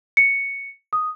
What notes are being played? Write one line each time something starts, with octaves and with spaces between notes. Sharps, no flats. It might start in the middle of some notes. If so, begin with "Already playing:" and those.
C#7
D#6